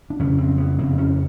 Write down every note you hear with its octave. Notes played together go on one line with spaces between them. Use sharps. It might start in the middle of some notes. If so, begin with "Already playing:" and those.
D4
F2 C#3 C#4
C4
B3
F2 C#3 C4
C#4